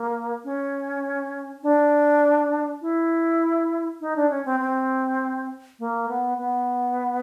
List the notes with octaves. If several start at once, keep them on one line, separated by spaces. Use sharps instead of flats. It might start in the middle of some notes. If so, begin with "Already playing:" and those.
Already playing: A#3
C#4
D4
E4
D#4
D4
C#4
C4
C4
A#3
B3
B3